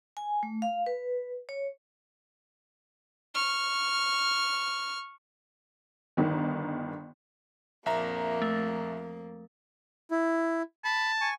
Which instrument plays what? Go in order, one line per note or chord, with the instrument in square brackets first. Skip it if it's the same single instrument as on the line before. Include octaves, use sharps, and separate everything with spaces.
[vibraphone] G#5
A3
F5
B4
C#5
[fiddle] C#6 F6
[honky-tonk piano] G1 D#3
[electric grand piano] A#1 E5 A#5 [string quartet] F2 A#3
[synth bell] A3
[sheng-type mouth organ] E4
[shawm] A5 [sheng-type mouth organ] B5
[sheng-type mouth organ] G#5 C#6